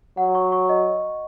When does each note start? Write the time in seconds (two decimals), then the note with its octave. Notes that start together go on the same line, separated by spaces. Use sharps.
0.17 F#3 F#5
0.35 C#6
0.52 C#6
0.69 D#5